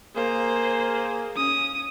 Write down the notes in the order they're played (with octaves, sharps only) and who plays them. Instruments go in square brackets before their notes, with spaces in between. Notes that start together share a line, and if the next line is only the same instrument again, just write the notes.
[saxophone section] A#3 G#4 [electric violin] C5
[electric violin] C#4 D#6